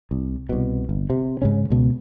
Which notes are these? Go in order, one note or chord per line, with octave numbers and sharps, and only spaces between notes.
C2
C2 B2
G1
C3
G#2 C#3 C#4
C#2 B2